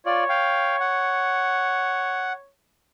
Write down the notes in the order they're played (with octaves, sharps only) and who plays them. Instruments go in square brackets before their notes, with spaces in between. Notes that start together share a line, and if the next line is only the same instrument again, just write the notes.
[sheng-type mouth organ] F4 D5 [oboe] C#5
[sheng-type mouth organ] F5 G5
F#5